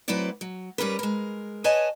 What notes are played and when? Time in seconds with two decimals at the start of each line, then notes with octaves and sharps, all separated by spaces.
0.08 F#3 A3 C4 E4 B4 D5
0.41 F#3
0.78 G3 C#4 A#4 B4
0.99 G#3 A#4
1.64 B4 C#5 D#5 G#5 A5